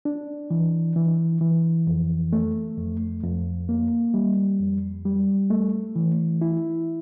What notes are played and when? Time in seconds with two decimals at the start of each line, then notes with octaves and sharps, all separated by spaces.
0.05 D4
0.50 E3
0.96 E3
1.41 E3
1.87 F2
2.33 A3
2.78 F2
3.23 F2
3.69 A#3
4.14 G3
4.60 F2
5.05 G3
5.50 A3
5.96 E3
6.41 E4